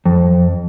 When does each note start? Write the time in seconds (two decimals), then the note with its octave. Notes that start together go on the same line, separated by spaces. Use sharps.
0.06 F2